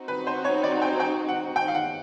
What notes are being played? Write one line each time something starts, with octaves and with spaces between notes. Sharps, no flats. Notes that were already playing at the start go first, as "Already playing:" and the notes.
Already playing: C4 D#4 F#4
B4
C5
C#5
D5
G5
G5
F#5
G5
F5
F#5